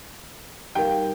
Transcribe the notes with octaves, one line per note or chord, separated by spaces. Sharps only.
G3 D#4 A#4 F5 G5